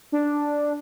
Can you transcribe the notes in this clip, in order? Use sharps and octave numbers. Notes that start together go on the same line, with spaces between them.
D4